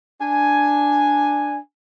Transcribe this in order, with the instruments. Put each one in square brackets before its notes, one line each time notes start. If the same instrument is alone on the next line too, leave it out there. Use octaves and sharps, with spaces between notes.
[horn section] D4 G#5